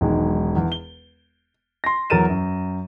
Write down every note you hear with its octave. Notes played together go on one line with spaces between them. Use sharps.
E1 B1 D#3 G#3
E2
G7
C6 A#6
E2 F#3 A#4 A6 D#7 E7
F#2